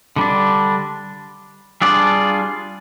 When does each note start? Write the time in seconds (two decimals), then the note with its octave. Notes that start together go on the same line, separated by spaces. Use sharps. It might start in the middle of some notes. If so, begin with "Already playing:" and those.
0.16 D3 G3 D4
1.82 G3 D4 F4 G#4 D5